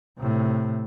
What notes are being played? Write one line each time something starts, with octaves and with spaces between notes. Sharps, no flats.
A2 C3